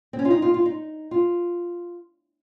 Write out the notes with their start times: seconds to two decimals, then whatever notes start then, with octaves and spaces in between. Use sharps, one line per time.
0.13 C4
0.19 C#4
0.25 F4
0.30 D#4
0.42 F4
0.54 F4
0.66 D#4
1.11 F4